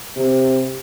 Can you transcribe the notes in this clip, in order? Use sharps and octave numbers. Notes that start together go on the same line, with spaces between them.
C3